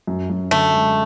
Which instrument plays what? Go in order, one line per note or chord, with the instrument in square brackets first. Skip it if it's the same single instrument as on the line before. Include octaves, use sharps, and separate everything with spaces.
[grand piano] F#2
F#2
[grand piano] D3 [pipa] A3
[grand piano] G#3